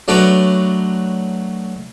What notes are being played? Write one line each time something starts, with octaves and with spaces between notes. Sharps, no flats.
F#3 A3 D4 A#4 B4 C#5